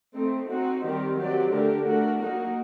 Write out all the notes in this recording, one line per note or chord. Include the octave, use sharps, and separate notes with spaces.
A3 C4 D#4
C4 D#4 F#4
D#3 G3 C4 G4 A#4
F#3 C4 G4 D5
D3 A3 D4 G4 A#4
A3 D4 F#4 A#4
F#3 A#3 D#4 F#4 A#4